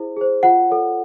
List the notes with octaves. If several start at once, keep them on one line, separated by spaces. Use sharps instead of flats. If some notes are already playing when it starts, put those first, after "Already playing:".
Already playing: E4 G#4 C5
G#4 C5
F4 F#5
A4 C#5